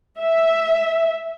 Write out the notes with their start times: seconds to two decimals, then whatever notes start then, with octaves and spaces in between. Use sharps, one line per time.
0.20 E5